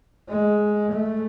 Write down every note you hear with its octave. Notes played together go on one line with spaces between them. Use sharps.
G#3
A3